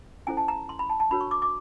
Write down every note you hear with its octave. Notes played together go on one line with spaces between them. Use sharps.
C#4 E4 A4 C5 G#5
A5
A#5
C6
B5
A5
A5
D4 F#4 A#4 C#5 B5
C#6
D6
D6